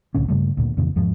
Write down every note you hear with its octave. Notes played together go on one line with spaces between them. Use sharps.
C2 A2 D3 C#4
G2 C#3 G3 A3
D2 A#2
F2 A#2 C#3 E3
E2 G#2 F3 G#3